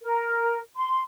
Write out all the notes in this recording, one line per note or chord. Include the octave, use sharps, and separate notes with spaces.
A#4
C6